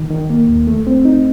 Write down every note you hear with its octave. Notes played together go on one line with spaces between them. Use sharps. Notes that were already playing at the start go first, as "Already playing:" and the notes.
Already playing: D#3
D#3
A#3
D#2
A3
C4
D#4